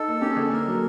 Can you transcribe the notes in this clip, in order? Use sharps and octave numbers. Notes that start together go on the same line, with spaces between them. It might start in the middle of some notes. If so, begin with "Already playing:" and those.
Already playing: D#4 A4
A#3
C#4 G4
G#4
D3 A4
A#3 A#4
F#3